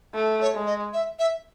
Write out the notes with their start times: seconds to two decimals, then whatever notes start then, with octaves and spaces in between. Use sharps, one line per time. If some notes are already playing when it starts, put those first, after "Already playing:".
0.14 A3
0.41 C#5
0.54 G#3
0.66 D#5
0.93 E5
1.19 E5